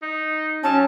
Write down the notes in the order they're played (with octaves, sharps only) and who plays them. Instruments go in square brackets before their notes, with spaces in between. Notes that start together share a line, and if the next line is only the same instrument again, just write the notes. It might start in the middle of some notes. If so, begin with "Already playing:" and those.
[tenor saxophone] D#4
[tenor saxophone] F#3 [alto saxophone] C#4 [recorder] A5